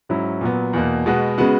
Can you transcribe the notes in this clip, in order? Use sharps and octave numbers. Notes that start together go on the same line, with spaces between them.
G#2 F#3 C#4 E4
A#2 F#3 B3
E2 B2 A#3
B2 G#3 B3 F#4
C#3 G#3 B3 F#4